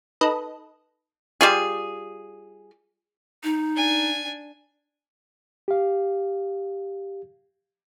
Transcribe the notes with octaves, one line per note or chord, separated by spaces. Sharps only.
D#4 A4 B4 D#5
G3 F4 G#4
D#4
D4 G#5
G4 F5